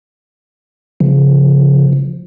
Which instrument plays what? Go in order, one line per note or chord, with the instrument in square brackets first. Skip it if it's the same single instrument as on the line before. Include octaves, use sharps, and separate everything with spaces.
[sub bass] C#3 [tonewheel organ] F3